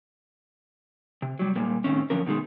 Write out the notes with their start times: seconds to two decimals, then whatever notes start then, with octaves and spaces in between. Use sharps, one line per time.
1.22 C3
1.39 F#3 G3
1.56 A#2 G3 G#3 A#3
1.84 A2 D#3 C4 C#4
2.10 F#2 D3 F3 C#4 A#4
2.26 B2 D#3 G3 G#3